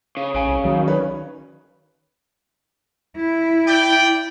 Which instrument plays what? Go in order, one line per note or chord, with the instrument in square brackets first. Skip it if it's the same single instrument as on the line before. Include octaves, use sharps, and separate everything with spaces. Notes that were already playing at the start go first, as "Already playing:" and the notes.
[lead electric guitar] C#3
[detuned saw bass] A1 [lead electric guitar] C#3 [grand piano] G#5 D7
[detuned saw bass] C2
[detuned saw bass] D#3 [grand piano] F#3
[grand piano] C#4 B4 C#5
[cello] E4
[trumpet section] D5 G5